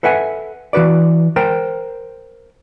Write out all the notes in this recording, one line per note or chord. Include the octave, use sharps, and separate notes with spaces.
A4 B4 E5 F#5 G#5
E3 F#4 B4 D5
A#4 C5 G5